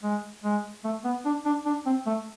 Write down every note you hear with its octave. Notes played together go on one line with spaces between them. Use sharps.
G#3
G#3
A3
B3
D4
D4
D4
C4
A3